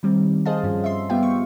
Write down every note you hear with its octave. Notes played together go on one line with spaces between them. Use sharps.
D#3 G3 C4
G#4 C5 D#5 F5 A5
G2 F3 C#4
E5 C6
G3 B3 F4 E5 F5 G5
C#6